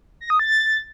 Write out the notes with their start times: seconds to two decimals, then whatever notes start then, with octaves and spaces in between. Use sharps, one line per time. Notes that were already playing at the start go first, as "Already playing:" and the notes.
0.21 A#6
0.30 D#6
0.39 A6